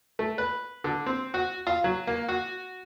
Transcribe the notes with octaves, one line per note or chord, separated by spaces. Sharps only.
A3
B4
D3
C4
F#4
F4
F#3
A#3
F#4